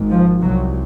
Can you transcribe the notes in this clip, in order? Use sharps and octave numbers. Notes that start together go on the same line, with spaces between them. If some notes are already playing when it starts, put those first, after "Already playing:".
Already playing: G#1 G#2
F3
C2 C3 F#3